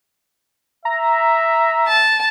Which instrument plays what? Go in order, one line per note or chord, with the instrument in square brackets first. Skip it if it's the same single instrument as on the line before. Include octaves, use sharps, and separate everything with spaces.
[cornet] E5 [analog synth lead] A#5
[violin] A5